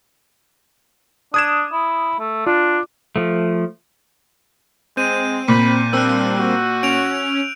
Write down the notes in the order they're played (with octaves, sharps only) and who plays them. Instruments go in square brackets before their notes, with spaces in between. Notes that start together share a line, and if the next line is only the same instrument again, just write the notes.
[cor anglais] D4 [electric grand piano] D#6 G#6 E7
[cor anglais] E4
A3
[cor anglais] D4 [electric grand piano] F4
[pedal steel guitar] F3 A3
[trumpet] G#3 [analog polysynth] C4 [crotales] G6 D#7
[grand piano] A#2 [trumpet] B5
[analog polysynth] G3 A#3 C4 [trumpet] D4 [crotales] E6 F#6
[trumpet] F#4
[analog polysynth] C#4 [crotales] D7 F7